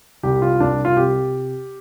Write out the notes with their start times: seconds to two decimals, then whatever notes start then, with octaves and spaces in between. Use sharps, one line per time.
0.23 C2 G4
0.42 F4
0.60 C2 D4
0.85 F4
0.97 C3 G4